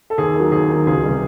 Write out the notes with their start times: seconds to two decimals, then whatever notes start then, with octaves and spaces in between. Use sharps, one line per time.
0.10 A4
0.18 D#2 G#4
0.35 D#3 F#3
0.52 D#2 G#4
0.69 D#3 F#3
0.87 C#2 G#4
1.04 C3 E3 G3